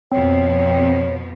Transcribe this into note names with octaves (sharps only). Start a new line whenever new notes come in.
F2 B2 F3 C4 C#5